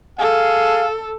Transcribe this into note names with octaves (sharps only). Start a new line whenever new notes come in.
G#4 A4 F5